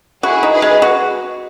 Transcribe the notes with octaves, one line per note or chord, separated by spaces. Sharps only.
E4 F#4 G#4
D#4
G#4 B4
G#3
F#4